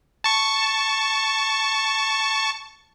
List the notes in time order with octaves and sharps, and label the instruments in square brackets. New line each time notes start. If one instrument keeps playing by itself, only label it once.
[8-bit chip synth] A5 C#6